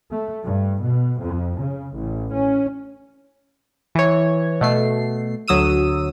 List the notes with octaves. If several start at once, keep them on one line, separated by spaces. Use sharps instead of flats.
A3
G2
B2
F2
C#3
A1
C#4
E3 C#5
B2 A3 C7
D2 F#3 D#6 E6 D#7